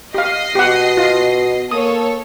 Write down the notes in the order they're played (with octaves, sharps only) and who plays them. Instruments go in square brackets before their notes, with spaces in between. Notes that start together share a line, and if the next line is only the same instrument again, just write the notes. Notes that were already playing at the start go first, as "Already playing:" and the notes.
[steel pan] G4 F5 [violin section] D#5 C7
[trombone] B2 [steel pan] G4 F#5
[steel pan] F4
[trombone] A#3 [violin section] A4 C#5 [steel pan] D#6